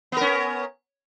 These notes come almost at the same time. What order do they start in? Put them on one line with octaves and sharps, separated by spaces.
B3 A#4 C#4